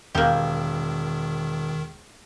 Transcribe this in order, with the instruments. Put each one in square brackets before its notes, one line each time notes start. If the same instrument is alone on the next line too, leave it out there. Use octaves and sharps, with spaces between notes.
[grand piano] E1 [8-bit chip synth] D#3 [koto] A#3 G4